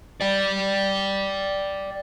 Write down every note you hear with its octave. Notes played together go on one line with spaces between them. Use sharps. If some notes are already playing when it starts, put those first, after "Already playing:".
D5 G5